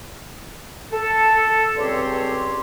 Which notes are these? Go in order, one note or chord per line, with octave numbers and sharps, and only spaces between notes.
A4
C#2 G2 C4 G4 C#5 C6